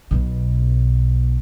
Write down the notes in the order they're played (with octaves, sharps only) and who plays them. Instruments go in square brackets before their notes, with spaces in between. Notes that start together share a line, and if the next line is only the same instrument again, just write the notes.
[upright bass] B1 B2